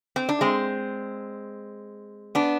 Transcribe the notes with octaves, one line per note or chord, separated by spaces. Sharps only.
C4
D4
G#3 C4
B3 D4